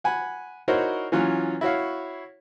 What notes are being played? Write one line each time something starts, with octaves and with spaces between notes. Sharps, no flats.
F#5 G#5 B5
D#4 E4 F#4 A#4 C5 C#5
E3 F#3 C#4 F4
E4 F#4 C#5 F5